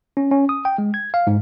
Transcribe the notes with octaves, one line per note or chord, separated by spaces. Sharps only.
C#4
C#4
D#6
G5
G#3
G#6
F5
G#2